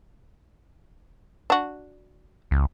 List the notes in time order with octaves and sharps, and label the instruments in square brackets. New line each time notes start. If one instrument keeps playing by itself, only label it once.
[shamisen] D4 F#4
[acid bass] C#2